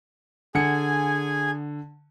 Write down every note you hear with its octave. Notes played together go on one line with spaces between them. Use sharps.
D3 G#4 F#5 G#5 C#7